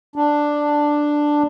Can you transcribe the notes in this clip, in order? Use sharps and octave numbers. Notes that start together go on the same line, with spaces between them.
D4